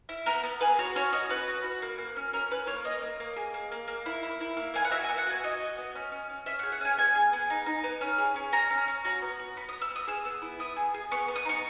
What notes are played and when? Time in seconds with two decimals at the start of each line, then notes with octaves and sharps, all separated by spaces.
0.09 E4
0.26 B3 A#4
0.43 B3
0.61 G#4 B4
0.79 F#4 C#5
0.95 C#4 C#5
1.12 F#4 D#5
1.29 F#4 B4
1.48 F#4
1.64 F#4
1.82 A#3
1.98 A#3
2.16 C#4
2.33 C#4 A#4
2.51 C#4 B4
2.67 A#3 C#5
2.84 A#3 D#5
3.02 A#3
3.20 A#3
3.36 G#4
3.54 A#3
3.72 A#3
3.88 A#3
4.06 E4
4.23 E4
4.40 E4
4.57 A#3
4.74 A#3 G#5
4.84 F#5
4.91 F#4 E5
5.04 G#5
5.09 B3
5.18 F#5
5.27 F#4 G#5
5.44 F#4 D#5
5.60 F#4
5.78 B3
5.95 C#4
6.12 C#4
6.30 C#4
6.46 C#4 E5
6.59 F#5
6.63 G#4
6.72 F#5
6.81 C#4 G#5
6.98 B3 G#5
7.15 G#4
7.33 B3
7.50 D#4
7.66 D#4
7.84 B3
8.01 C#4
8.18 G#4
8.36 C#4
8.52 C#4 A#5
8.70 C#4
8.88 C#4
9.05 F#4 A#5
9.22 B3
9.40 F#4
9.57 B3 B5
9.69 D#6
9.73 B3
9.82 E6
9.90 B3
9.96 D#6
10.07 G#4 E6
10.25 B3
10.42 E4
10.59 B3 D#6
10.76 G#4
10.94 G#4
11.11 B3 C#6
11.28 B3
11.36 D#6
11.45 D#4 C#6